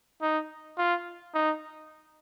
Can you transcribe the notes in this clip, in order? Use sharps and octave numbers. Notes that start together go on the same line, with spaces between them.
D#4
F4
D#4